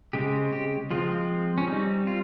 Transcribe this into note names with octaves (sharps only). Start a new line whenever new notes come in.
C#3 G#3 C4 G4
G4
F3 G#3 C4 F4
C#4
G3 C4 D#4
F4